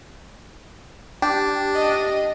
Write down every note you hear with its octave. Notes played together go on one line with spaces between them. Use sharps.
D4 G4
D#5